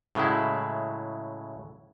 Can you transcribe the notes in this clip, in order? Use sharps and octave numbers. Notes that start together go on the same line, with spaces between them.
A2 C#3 F#3 G#3 E4